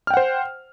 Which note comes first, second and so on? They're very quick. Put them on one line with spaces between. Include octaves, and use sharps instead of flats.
F6 G5 F#5 C5